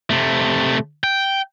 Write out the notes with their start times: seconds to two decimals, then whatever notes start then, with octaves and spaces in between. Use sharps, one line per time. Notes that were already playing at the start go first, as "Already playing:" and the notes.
0.10 C3 A3
1.04 G5